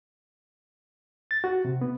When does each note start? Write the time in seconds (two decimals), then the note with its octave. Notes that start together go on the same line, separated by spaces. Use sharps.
1.31 A6
1.44 F#4
1.65 C3
1.81 B3